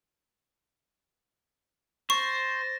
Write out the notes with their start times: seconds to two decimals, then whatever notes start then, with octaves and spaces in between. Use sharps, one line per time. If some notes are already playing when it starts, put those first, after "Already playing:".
2.10 C5 C#6 A6 A#6